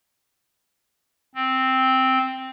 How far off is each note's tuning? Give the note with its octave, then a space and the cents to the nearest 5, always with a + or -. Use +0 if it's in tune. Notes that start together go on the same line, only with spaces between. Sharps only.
C4 +0